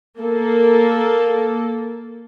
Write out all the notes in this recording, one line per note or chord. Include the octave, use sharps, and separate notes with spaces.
A#3 A4